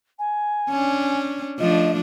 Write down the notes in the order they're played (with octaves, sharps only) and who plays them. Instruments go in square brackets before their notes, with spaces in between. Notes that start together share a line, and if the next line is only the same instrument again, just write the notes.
[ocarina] G#5
[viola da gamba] C#4 D4
[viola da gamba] F3 A3 D4 [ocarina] D#5